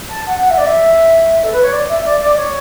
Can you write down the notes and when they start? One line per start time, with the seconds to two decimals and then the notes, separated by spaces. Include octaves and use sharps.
0.09 A5
0.26 F#5
0.42 F#5
0.50 E5
0.57 D5
0.66 E5
1.43 A4
1.52 B4
1.62 C#5
1.72 D5
1.89 E5
2.05 D5
2.20 D5
2.37 C#5